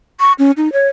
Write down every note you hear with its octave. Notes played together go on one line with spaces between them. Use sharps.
C#6
C#4
D#4
C#5